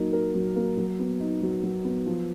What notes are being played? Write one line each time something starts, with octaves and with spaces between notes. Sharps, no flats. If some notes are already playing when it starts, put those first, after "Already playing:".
Already playing: F#3 A#3 D#4
A#4
F#3
A#3
F#3
B3
D#4
F#3
F#3
B3
F3